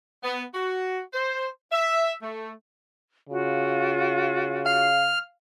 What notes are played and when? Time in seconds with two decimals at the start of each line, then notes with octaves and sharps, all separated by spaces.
0.23 B3
0.55 F#4
1.14 C5
1.72 E5
2.22 A3
3.30 C#3 F4 F#4
4.66 F5 F6 C7